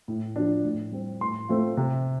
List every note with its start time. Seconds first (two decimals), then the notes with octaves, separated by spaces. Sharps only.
0.08 A2
0.36 F3 D4
0.65 A2
0.92 G3 C4
1.21 A2 C6
1.49 A3 C4 F4
1.77 C3